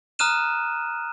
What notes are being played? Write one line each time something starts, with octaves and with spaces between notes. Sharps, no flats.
A#5 D#6 F6 F#6 D#7 E7